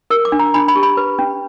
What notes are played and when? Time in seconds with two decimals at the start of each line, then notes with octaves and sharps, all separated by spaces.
0.10 A#4 E6
0.25 D6
0.32 D4
0.39 A#5
0.54 D4 B5
0.68 B5
0.75 G4
0.83 B5
0.97 B4
1.19 C#4